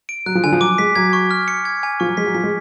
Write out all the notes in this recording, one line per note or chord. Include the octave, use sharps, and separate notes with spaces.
D7
F#3 F#6
F3
D3 G#5
F3
F#3 D6
G#3 B6
F#3 G#6
C#6
F6
C#7
G#6
G#5
F3 C#6
F#3
G#3 B6
F#3
F3 B6
G#3